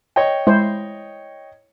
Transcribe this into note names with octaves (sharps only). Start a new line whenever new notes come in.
C#5 D#5 G5
G#3 E4 C5